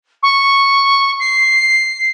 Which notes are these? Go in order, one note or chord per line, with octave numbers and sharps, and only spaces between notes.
C#6
C7